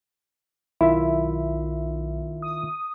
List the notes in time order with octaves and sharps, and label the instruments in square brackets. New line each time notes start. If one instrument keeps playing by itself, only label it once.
[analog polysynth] B1 [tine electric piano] D#3 F4 E5 [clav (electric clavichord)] E4
[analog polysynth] D#6